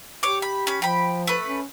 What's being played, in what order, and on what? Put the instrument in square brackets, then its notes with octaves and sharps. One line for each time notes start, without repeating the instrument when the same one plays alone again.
[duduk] G4 [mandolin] C#5 D6
[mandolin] B5
C#4 B5
[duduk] F3 [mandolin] G5 B5
[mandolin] A3 B4
[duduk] C#4